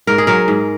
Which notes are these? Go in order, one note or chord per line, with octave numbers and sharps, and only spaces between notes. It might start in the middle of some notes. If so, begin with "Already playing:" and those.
G#2 A#4
G#4
F#3 A#4
G#2